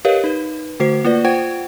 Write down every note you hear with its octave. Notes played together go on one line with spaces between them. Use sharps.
G4 A#4 B4 C#5 D#5 F5
D#4 B4
D3 A3 F#4 C5 C7
A#3 F4 B4 D5
F4 C5 F#5 G5 G#6 D7